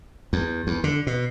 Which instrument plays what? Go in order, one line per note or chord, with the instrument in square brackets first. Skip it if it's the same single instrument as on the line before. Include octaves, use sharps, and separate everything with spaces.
[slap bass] E2
E2
D3
B2